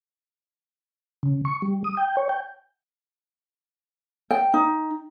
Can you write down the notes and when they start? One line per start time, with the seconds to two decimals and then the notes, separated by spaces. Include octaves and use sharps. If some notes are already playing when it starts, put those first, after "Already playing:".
1.23 C#3
1.45 C#6
1.62 G3
1.84 D#6
1.97 G5
2.17 C#5
2.29 G5
4.31 G5
4.54 D#4